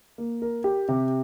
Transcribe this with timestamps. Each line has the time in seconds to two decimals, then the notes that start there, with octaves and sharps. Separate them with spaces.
0.18 A#3
0.42 A#4
0.64 G4
0.89 C3